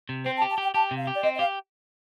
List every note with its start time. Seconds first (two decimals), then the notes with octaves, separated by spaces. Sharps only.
0.09 C3
0.25 C4 C5
0.37 A5
0.42 G4
0.50 A5
0.58 G4 G5
0.74 G4 A5
0.91 C3
0.98 F5
1.07 G4
1.15 D5
1.23 C4 D#5
1.34 D#5
1.39 G4 F5